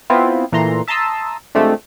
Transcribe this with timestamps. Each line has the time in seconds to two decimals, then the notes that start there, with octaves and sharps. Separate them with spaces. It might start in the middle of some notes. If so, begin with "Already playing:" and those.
0.10 B3 C4 E4 F4
0.52 A#2 E3 A3 A#5 C6
0.88 E5 A5 A#5 C6 D#6 E6
1.55 C3 F3 G#3 A3 C4 D4